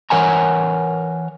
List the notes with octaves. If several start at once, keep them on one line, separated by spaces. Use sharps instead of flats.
E3 A#4 C#5 F#5 G#5 A#5